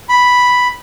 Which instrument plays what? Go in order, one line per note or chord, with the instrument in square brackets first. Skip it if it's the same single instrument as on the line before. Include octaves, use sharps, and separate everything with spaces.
[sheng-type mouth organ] B5